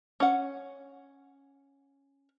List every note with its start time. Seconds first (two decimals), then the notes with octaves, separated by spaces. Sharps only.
0.20 C#4 F#5